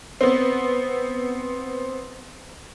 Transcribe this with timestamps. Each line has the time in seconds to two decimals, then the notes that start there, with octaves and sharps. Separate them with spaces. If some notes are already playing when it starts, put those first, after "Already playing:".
0.21 B3 C4